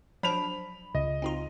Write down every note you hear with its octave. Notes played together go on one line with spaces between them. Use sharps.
F3 F#3 D4 B5 F7
C#2 D#5
C4 D#4 F4